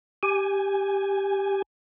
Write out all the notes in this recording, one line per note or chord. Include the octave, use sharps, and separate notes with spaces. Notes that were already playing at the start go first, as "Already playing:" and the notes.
G4 G#5